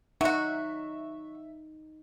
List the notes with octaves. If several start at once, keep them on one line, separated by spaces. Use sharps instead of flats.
F#3 D#4 F#4 E5